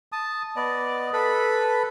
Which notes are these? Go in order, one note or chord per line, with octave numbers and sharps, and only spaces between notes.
A5 D#6
B3 D5 D#5
A4 B4 B5